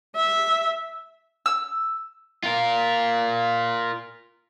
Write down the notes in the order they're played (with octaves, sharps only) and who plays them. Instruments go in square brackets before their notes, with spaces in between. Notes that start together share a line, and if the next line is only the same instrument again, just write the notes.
[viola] E5
[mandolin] E6
[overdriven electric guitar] F4 A#4